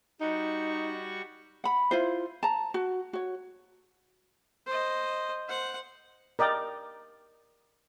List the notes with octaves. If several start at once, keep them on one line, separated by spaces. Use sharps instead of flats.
G3 D#4 F#4 C#6
F#5 B5
E4 F4 C5
A5 A#5
F#4
F#4 C#5
C5 D#5
C5 F#5
A#4 D5 D#5 G5